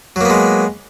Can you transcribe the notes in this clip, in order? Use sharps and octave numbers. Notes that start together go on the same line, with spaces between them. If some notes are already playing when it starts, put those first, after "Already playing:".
F#3 G#3 A#3 B3